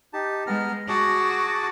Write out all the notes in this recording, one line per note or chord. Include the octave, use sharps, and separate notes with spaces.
D#4 G4 A5
G#3 B3 A#5 F6
F#4 G#4 A5 D6